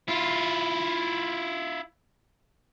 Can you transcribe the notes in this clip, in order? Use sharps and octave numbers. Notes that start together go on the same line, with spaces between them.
E4 F4